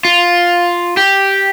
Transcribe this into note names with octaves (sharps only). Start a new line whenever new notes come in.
F4
G4